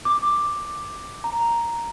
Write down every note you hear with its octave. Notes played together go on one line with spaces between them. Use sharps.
D6
A#5